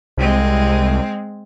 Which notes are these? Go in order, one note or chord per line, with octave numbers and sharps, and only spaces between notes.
C2 G#3 C4